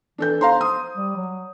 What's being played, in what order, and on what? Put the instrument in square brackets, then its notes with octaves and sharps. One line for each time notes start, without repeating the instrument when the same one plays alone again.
[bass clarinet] E3 [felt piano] D4 A4 G6
[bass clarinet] C5 [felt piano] F5 A#5 C6
[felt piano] D#6
[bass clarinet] G3
F#3